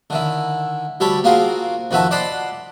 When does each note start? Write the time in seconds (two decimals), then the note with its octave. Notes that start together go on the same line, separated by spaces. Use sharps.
0.10 D3 D#3 E4
1.00 D2 G3 G4 A4 C#5 B5
1.24 A#3 C4 F4 F#4 G#4 A#4
1.91 F2 D#3 F#4 B4 E5 A5
2.11 D5 D#5 F#5 A5 B5 C6